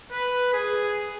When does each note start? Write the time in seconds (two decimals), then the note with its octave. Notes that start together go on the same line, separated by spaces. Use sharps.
0.11 B4
0.53 G#4